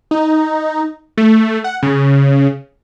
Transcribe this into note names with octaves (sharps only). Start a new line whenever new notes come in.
D#4
A3
F#5
C#3